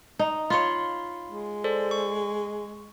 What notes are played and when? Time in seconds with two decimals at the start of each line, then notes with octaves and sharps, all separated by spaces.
0.19 D#4
0.50 F4 C#5 B5 C6
1.29 G#3
1.64 A4 C5 D5
1.91 C#6